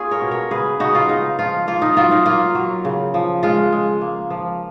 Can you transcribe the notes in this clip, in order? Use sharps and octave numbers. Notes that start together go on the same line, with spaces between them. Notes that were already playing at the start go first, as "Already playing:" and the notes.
Already playing: A#3 C#4 F4 G#4
A#4 C#5
B2
A#4 C#5
C#3 G#4 B4
C#3 D#4 F#4
F4
C#3 D#4
F3 F4
A#3 F4
D#4
F#3 F4
D#4
A#3 F4
F#3
C#3
F3
G#3 F4
G#3
A#3
F3